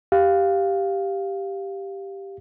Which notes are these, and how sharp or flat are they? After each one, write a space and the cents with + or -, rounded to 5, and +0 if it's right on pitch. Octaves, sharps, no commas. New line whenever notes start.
G4 +0 F5 +0